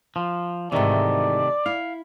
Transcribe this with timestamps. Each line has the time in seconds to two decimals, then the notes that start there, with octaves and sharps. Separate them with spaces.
0.16 F3
0.72 G#2 C3 D#3 E3 A3 D5
1.66 E4 F5